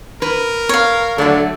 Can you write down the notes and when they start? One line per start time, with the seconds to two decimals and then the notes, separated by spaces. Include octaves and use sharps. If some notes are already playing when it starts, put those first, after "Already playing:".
0.22 A#4 B4
0.69 C#5 F5
1.18 D3 F#3 A3